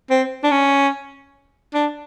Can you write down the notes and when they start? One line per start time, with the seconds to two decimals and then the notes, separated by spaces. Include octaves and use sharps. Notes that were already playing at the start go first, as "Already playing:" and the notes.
0.10 C4
0.44 D4
0.51 C#4
1.74 D4